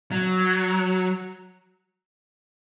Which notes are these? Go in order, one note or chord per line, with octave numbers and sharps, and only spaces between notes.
F#3